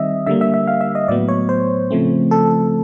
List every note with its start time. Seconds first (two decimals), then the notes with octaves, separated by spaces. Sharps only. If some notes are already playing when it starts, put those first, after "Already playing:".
Already playing: D#3 G3 C4 D#5 E5
0.26 D3 G3 A#3 E5
0.41 E5
0.54 E5
0.67 F5
0.81 E5
0.95 D#5
1.08 A2 F#3 B3 D5
1.28 C#5
1.49 C5
1.91 C#3 F3 A3 C4
2.31 A4